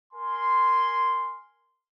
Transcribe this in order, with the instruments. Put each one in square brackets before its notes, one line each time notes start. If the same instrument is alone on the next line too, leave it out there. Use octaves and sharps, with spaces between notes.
[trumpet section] A#4 G#5 C6